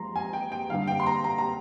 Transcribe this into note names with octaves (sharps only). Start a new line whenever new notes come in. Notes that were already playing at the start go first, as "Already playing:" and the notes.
Already playing: F3 G#3 A#5 C6
G#5
G5
G5
G2 D3 G3 F5
G5
C6
A#5
A#5
A#5